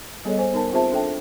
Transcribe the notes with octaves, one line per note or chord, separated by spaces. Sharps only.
G3 B3 G#4 A4 C#5 D#5
C5 G#5
B3 D#4 A#4 A5
C4 F4 G#4 C5 E5 A5
D4 A4 E5 G5 A5